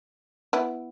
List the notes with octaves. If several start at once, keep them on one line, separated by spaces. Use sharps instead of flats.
B3 E4